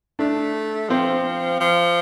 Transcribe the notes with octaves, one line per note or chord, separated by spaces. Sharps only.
A3 D4
F3 C4
F3